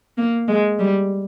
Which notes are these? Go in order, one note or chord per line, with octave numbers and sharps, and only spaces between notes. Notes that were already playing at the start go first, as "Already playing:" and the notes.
A#3
G#3
G3